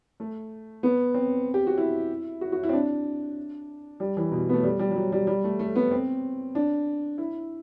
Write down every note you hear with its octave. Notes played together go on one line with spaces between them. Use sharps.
A3
B3
C4
G4
F#4
E4
F#4
F#4
E4
C4
D4
G3
E3
B2
B3
A3
G3
G3
G3
F#3
G3
G3
A3
A3
B3
C4
D4
E4